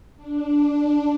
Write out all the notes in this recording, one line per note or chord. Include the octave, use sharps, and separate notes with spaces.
D4